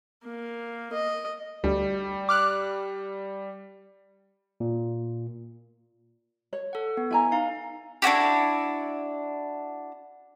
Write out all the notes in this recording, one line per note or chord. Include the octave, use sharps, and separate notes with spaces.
A#3
D#5
D2 G3
D6 F6 F#6
A#2
C#5
A4 F#5
B3
E4 G#5 A#5
D#4 F5
D4 E4 F#4 G4